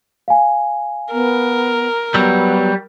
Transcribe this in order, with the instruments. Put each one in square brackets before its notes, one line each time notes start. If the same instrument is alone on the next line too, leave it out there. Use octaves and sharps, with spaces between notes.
[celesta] F5 G#5
[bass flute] B3 [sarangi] A#4
[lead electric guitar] F#3 G3 [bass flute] B3 [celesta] E6